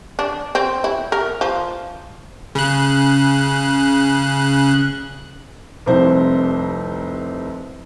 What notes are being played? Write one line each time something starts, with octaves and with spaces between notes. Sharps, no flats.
D4
C4
E4
A#4
F3
C#3 F#6
F1 C2 C5